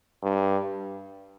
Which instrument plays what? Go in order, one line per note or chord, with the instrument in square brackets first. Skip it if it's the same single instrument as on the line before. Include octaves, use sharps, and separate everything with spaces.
[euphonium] G2